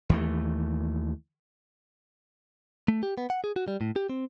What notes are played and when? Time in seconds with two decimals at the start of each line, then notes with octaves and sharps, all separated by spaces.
0.09 D#2 E3 A3
2.88 A3
3.03 G4
3.18 B3
3.30 F#5
3.44 G#4
3.56 F#4
3.68 G3
3.81 A2
3.96 G4
4.09 C4